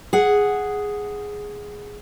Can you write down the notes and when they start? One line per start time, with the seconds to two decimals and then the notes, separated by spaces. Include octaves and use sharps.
0.13 G#4 F#5